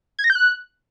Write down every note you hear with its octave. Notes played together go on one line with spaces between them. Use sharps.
G#6
A#6
G6
F#6